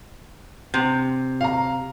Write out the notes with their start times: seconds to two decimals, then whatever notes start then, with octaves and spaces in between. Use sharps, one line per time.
0.74 C3
1.41 F5 A#5